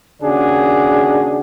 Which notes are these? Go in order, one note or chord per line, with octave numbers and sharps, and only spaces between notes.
D#2 C#3 D4 F#4 G#4